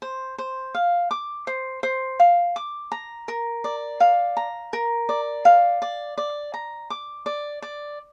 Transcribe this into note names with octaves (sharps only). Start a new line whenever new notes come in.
C5
C5
F5
D6
C5
C5
F5
D6
A#5
A#4
D5
F5
A#5
A#4
D5
F5
D5
D5
A#5
D6
D5
D5